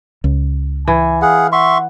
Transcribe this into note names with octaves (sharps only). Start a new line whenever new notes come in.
C#2
E3 G#5
G#4 F5 F#5
E5 F#5 C6 C#6